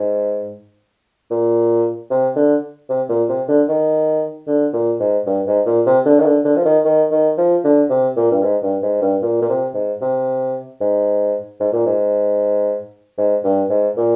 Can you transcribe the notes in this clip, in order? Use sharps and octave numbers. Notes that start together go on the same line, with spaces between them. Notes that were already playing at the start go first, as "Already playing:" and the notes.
Already playing: G#2
A#2
C3
D3
C3
A#2
C3
D3
D#3
D3
A#2
G#2
G2
G#2
A#2
C3
D3
D#3
D3
D3
F3
D#3
D#3
D#3
F3
D3
C3
A#2
G2
G#2
G2
G#2
G2
A#2
A#2
C3
G#2
C3
G#2
G#2
A#2
G#2
G#2
G2
G#2
A#2